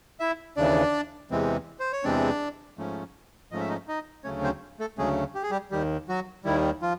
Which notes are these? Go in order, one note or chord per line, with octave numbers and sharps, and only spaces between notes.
E4 E5
D#2 C#3 E3 D4 D5
E2 C3 E3 G#3 C4
C5
C#5
E2 C3 E3 G#3 C4 D4 D5
G#2 F3 A3 C#4
G#2 F3 A3 C#4 D#5
E5
D#4 D#5
D#4 D#5
D2 C#3 F#3 A3 C#4 C#5
C4 C5
A3 A4
D2 C#3 F#3 G#3 A3 C#4 G#4
G4
G#4
G3 G4
D#2 D#3 G3 G4
F#3 F#4
D#2 D#3 G3 E4
F3 F4